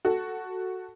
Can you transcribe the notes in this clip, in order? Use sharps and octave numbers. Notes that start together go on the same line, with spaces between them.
F#4 A4